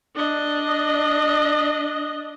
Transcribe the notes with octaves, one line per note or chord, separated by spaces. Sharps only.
D4 D#5